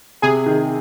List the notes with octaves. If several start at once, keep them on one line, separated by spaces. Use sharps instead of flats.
C3 G#4
D#3